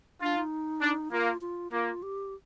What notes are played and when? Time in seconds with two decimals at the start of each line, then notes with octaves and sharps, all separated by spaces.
0.22 D4 F4
0.37 D#4
0.81 D4
1.11 A#3 F4
1.41 F4
1.72 A#3 F4
2.03 G4